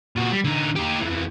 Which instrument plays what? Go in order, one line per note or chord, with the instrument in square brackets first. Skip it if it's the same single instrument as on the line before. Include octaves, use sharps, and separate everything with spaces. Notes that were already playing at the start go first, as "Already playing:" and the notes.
[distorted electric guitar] A#2 F#4
G3
D3 D#4
D#4 G4
F2 E3